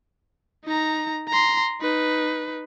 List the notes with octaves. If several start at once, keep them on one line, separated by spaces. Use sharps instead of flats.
D#4 A#5
A#5 C6
D#4 B4